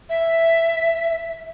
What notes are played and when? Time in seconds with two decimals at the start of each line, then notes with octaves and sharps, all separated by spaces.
0.09 E5